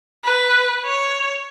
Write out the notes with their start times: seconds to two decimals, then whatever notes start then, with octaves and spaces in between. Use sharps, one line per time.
0.25 B4
0.85 C#5